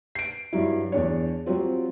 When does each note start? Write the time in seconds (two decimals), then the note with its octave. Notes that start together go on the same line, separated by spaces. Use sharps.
0.15 C7 D7
0.53 G2 F#3 E4
0.92 E2 D4 C#5
1.46 F#3 G3 C4 F4